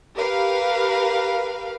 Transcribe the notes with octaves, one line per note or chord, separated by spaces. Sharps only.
G4 A#4 B4 F5